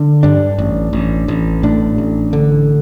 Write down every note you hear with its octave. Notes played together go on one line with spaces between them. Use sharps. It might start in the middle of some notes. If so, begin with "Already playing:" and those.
Already playing: D3
G2 D4
A1
A1
A1
A2 D4
A1
D3